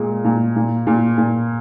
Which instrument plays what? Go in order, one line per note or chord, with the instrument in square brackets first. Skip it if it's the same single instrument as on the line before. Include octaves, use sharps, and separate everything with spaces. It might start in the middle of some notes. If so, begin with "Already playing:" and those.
Already playing: [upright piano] A#2 G#3
A#2
A#2
A#2
A#2